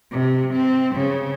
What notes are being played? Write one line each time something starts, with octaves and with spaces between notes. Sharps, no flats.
C3
C4
C#3